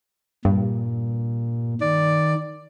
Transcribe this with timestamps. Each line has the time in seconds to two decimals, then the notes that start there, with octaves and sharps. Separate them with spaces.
0.45 G2 A#2
1.81 D#3 D5